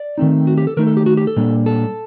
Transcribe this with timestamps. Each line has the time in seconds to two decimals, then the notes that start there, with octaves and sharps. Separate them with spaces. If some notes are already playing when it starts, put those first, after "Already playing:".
Already playing: D5
0.18 D#3 A3 C4 D#4
0.47 F#4
0.58 G4
0.67 A4
0.77 D#3 A3 D#4 A#4
0.87 A4
0.97 G4
1.06 F#4
1.17 G4
1.27 A4
1.36 A#2 G3 A#3 D4
1.66 A4